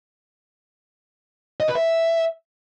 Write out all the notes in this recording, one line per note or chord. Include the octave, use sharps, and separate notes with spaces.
D#5
B4
E5